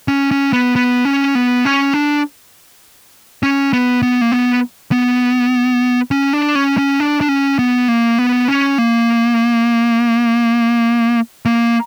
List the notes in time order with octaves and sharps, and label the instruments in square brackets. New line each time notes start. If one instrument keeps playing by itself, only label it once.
[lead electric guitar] C#4
C#4
B3
B3
C#4
B3
C#4
D4
C#4
B3
B3
A#3
B3
B3
C#4
D4
C#4
C#4
D4
D4
C#4
B3
A#3
B3
C#4
A#3
A#3